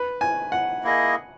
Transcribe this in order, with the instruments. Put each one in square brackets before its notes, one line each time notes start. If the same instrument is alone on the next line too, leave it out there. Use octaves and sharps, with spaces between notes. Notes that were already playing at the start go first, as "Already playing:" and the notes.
Already playing: [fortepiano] B4
G#5
F#5
[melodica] A#3 E4 G#4 D#5